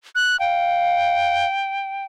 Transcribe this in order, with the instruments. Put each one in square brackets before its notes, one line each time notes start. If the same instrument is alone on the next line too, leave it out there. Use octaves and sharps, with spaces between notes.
[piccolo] F#6
[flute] F5 [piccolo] G5